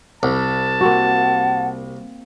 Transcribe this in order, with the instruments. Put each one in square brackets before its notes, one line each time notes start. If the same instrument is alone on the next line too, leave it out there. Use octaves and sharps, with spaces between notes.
[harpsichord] C2 [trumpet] A5
[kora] A#3 C4 F#4 [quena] F#5